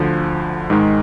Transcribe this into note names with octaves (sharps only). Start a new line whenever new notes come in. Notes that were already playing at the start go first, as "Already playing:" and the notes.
Already playing: D2 D3 F3
G#2 D#3 G#3